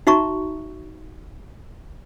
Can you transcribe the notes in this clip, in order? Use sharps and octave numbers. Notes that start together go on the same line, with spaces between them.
D#4 F#4 E5 A#5 C#6